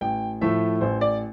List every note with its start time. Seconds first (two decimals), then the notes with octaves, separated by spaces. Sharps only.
0.01 A1 G5
0.41 A2 F3 A3 E5
0.81 A1 C5
1.01 D5